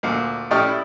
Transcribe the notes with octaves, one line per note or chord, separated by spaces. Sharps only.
D2 A#2
A2 C#4 G4 D5 D#6 F6
E4